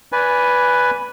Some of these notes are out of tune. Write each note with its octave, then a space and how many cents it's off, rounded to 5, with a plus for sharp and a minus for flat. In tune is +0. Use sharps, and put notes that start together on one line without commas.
B4 +0 D5 -20 G#5 +0